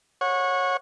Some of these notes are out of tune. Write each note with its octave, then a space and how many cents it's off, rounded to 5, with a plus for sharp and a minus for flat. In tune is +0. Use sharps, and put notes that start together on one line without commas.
C#5 -15 F#5 -25